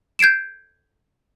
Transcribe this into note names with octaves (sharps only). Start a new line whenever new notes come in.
G6 G#6 C7 D7 E7